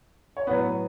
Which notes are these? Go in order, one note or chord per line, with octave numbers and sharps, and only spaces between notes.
C#5
A2 F#3 B3 B4